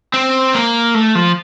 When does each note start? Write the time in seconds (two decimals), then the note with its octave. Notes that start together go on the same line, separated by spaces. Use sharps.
0.14 C4
0.55 A#3
0.95 A3
1.15 F3